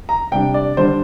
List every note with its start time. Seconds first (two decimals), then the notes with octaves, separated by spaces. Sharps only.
0.09 A#5
0.31 C3 G3 D4 G5
0.54 D5
0.77 D3 G3 D4 C5